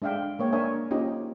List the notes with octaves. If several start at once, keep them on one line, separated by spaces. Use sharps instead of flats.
G#3 D4 E5 F5 G5
G#3 A#3 C#5 G5
D4 A#4 C#5 E5 G#5
A#3 C#4 D#4 F4 G4 D#5